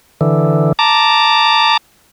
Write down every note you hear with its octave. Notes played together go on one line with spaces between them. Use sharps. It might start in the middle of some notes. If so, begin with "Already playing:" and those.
D3 E3
A5 A#5 D6